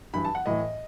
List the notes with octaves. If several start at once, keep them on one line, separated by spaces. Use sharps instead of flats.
G2 E3 B5
A5
F#5
A2 E3 D#5